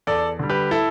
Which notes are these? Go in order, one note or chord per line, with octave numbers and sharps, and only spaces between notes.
E2 A4 D5
D3 G3
G4 B4
E4 A4